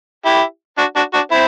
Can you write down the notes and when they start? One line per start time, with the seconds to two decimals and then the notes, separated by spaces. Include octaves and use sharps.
0.25 E4 G4
0.78 D4 F#4
0.96 D4 F#4
1.14 D4 F#4
1.31 C4 E4